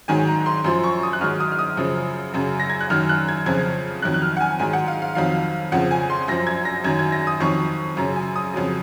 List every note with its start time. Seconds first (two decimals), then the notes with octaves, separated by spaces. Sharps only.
0.08 G#2 D#3 F#3 G#5
0.27 A#5
0.46 C6
0.64 F#2 F3 C6
0.84 C#6
1.03 D#6
1.13 F#6
1.21 G#2 D#3 F#3 F6
1.40 D#6
1.52 F6
1.59 D#6
1.77 F#2 C#3 F3
2.34 F#2 C#3 F#3
2.60 A#6
2.70 G#6
2.81 F#6
2.90 F#2 D#3 F#3 F6
3.09 F#6
3.28 G#6
3.46 F2 C#3 F3 G#6
4.02 F2 D#3 F#3 F#6
4.14 F#6
4.22 F6
4.37 F#5
4.41 G#5
4.59 G#2 D#3 F#3 G#5
4.73 F#5
4.88 F5
5.02 F5
5.15 F2 D#3 F#3 F5
5.72 F2 C#3 F3 F#5
5.91 G#5
6.10 C6
6.28 F#2 F3 A#6
6.47 G#6
6.65 A#6
6.84 F#2 D#3 F#3 G#6
6.99 G#6
7.12 A#6
7.27 D#6
7.40 F2 D#3 F#3 C#6
7.97 F#2 C#3 F#3 A#5
8.16 G#5
8.36 D#6
8.54 F2 C#3 F#3